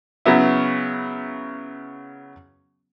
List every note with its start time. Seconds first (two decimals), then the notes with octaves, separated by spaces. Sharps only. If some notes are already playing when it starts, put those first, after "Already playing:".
0.26 C#3 F#3 B3 E4